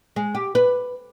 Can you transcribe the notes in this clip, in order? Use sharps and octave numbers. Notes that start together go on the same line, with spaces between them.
G#3
G4
B4